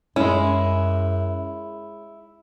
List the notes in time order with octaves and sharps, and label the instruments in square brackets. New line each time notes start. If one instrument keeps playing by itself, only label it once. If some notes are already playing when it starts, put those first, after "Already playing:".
[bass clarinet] F#2 [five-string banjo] G#3 C#4 [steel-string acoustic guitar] E4